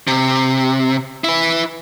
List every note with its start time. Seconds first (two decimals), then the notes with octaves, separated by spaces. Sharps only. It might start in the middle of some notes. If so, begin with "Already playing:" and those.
0.07 C3
1.24 E4 B4